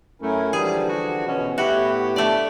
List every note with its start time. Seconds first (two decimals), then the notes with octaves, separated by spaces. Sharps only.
0.22 F#2 A3 C#4 E4 A#4
0.53 D3 E3 F3 G3 G#4
0.89 F#4
1.28 B2 C#4
1.58 A2 B3 E4 F#4 G4
2.16 A3 D4 D5